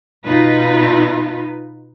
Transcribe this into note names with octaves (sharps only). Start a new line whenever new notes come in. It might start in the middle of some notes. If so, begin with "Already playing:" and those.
B2 D#4 F4 B4